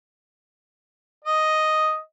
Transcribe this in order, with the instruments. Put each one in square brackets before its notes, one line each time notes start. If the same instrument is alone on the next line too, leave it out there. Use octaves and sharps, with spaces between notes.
[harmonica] D#5